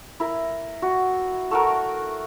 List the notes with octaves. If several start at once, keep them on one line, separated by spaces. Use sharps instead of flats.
E4 A#4
F#4
A3 F#4 A#4